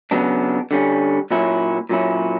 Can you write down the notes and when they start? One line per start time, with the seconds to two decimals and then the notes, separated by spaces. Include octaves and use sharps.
0.11 C#3 F#3 B3 D4
0.71 D3 G3 C#4
1.31 A#2 F#3 C#4 E4
1.89 A#2 F#3 C#4 E4